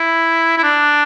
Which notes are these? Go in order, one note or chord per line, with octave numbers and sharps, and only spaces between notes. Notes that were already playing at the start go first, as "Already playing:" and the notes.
Already playing: E4
E4
D4